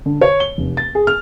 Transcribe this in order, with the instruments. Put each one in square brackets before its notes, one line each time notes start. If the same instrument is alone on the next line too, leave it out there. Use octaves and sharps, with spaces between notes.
[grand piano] D3
C#5
G7
F1
A6
G#4
F6